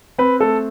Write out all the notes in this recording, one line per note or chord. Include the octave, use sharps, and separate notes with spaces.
C4 B4
A3 A4